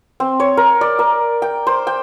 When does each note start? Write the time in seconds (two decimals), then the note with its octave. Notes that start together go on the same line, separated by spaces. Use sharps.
0.20 C4
0.40 C#5
0.57 A#4
0.81 D5
0.99 A#4
1.42 G5
1.67 C5
1.87 G5